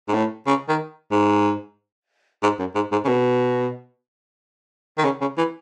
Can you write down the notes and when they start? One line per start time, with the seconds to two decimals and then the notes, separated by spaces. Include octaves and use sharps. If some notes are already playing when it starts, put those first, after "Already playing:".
0.08 G#2
0.14 A2
0.47 C#3
0.69 D#3
1.12 G#2
2.43 G#2
2.59 F#2
2.75 G#2
2.92 G#2
3.05 C#3
3.08 B2
4.98 D#3
5.04 C#3
5.21 C#3
5.38 E3